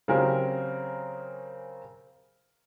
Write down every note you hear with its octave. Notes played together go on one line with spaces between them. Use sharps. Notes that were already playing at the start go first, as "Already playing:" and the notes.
C#3 F#3 C4 G4 G#4 A#4